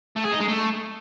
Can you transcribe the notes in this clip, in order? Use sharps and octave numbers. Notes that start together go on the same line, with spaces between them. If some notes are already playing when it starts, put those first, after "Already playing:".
A3
G#4
D#4
G#3
A3